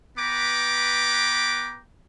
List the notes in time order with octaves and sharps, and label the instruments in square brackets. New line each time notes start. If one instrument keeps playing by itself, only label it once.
[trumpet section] B3 B4 G5 A#5 D6